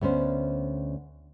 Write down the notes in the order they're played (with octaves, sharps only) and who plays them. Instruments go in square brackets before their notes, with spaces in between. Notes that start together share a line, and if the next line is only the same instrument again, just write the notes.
[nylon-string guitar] D2 B3 C#4 C5